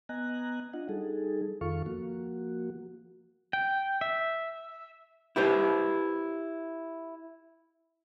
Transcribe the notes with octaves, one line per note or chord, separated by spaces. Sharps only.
B3 D#5 G#5 A#5 F#6
D4 F4 D#5 F#5
G3 D#4 G#4 A4
F2 D#3 F4 A4 F5 C#6
F3 A#3 F#4
G5
E5
E4 G4 B4 C5